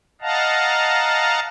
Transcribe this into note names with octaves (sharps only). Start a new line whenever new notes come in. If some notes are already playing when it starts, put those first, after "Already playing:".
D#5 F5 F#5 A5 A#5